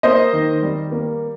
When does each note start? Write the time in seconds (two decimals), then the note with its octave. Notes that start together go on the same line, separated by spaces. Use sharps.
0.03 A#3 C5 D#5
0.33 D#3
0.63 G3
0.92 A#3